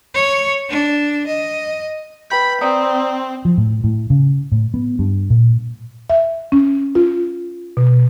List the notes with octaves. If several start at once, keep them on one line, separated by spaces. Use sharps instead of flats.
C#5
D4
D#5
B4 G5 B5 G6
C4 D5 A#5 D#6
F3
A2
A2
C#3
A2
B3
G2
A#2
E5
C#4
F4
B2